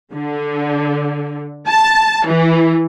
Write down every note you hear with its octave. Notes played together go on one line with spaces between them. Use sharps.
D3
A5
E3